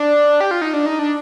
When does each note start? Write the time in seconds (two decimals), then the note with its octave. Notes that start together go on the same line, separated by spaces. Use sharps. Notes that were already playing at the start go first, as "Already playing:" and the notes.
Already playing: D4
0.41 G4
0.51 F4
0.62 D#4
0.74 D4
0.86 D#4
0.99 D4